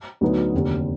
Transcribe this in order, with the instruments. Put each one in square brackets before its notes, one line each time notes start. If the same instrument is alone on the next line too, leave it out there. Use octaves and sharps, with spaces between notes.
[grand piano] D2 D3 F#3 B3 D#4
F1 D#2 D3